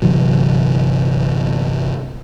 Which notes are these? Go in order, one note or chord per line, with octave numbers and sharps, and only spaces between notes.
G1 C3 E3 F#3